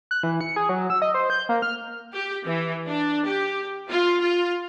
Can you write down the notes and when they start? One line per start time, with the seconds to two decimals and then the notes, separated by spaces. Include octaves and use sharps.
0.11 F#6
0.23 E3
0.41 C#7
0.56 G#4
0.69 F#3
0.90 E6
1.02 D#5
1.14 C5
1.30 G6
1.49 A#3
1.62 F6
2.13 G4
2.46 E3
2.87 D4
3.27 G4
3.88 F4
4.21 F4